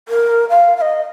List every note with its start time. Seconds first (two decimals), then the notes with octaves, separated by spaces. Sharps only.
0.08 A#4
0.50 F5
0.77 F5
0.81 D#5